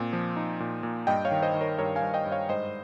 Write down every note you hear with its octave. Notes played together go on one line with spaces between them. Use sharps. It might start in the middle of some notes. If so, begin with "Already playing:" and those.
Already playing: A#2 C4
F3
D#4
A#2
A#2
G2 D#5 G5
C#5 F5
D#3
C5 D#5
D#3
A#4 C#5
G2 A#4 C#5
F5 G#5
G2
D#5 G5
G2
C#5 F5
G#2 C5 D#5